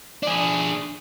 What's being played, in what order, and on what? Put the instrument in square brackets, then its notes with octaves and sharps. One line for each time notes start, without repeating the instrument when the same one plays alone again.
[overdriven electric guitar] D4 G#4